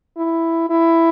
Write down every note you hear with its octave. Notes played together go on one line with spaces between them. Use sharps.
E4
E4